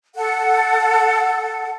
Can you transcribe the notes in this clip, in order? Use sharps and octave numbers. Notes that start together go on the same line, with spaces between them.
A4 F#5